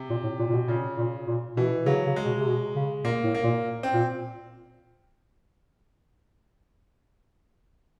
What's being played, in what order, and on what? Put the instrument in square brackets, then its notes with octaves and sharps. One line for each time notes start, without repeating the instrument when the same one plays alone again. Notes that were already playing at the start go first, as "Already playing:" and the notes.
Already playing: [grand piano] C3
[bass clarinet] A#2
A2
A#2
A#2
B2
[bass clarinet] A#2 [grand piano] C#3
[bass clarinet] A#2
A#2
[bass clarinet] B2 [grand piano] E3
[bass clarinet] C#3 [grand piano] F#3
[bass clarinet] C#3
[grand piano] G#3
[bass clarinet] B2
C3
B2
C#3
[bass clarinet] A#2 [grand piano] A#3
[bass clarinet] A2
[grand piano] A#3
[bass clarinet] A#2
[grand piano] C4
[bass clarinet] A#2